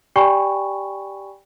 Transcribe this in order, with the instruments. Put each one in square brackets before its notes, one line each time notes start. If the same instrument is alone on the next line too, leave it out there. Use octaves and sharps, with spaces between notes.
[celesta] G4 D5 G5 G#5 B5 C#6